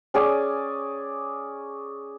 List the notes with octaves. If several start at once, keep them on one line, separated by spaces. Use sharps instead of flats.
C#4 G#4 D5 G#5